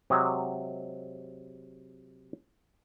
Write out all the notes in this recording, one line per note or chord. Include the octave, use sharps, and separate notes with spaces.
C3 F#3 G#3 D#5